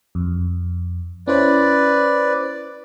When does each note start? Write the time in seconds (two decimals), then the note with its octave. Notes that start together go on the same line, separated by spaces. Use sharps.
0.15 F2
1.27 C#4 E4 B4 C5 D5